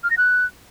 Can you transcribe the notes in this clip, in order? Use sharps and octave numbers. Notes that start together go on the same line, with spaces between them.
F6
A#6
F#6